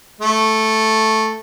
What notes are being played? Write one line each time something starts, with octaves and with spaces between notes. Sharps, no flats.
A3